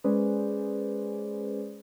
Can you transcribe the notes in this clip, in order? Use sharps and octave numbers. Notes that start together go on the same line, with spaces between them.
G#3 C#4 G#4 B4 C5 D5